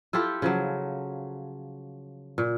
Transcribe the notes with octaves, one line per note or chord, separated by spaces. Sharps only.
E4 F4 G4 A4
C#3 F3 F#3
A#2